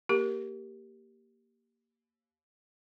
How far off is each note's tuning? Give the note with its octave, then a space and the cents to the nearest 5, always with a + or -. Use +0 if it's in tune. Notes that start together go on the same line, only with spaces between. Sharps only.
A#3 +0 G4 -5 A#4 +0